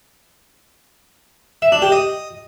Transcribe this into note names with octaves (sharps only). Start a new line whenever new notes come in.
E5
D4
G4
D#5